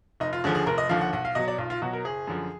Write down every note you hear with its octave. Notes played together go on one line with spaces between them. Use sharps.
F1 D#4
F4
D#2 D3 F3 G#4
G#4
F1 A#4
D#5
D#2 D3 F3 F5
F#5
B1 F#5
F5
B2 F#3 D#5
D5
B1 F4
F4
B2 F#3 F#4
A#4
F#1 G#4
F#2 D3 F3